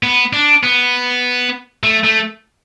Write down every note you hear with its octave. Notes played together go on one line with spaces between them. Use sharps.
B3
D4
B3
A3
A3